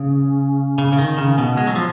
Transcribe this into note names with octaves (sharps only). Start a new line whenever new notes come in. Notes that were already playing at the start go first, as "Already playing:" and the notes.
Already playing: C#3
C#3
C#3
D#3
C#3
B2
G#3
F#3
F3